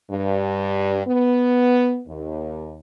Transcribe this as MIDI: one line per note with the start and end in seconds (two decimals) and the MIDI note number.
0.11 1.03 43
1.07 2.00 59
2.08 2.78 39